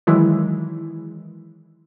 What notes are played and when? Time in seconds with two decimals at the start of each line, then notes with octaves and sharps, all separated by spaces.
0.07 D#3 E3 F#3 G#3 E4